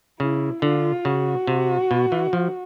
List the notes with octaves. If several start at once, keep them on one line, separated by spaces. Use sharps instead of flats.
C#3 E4
D3 F4
C#3 F#4
C3
B2
E3
F3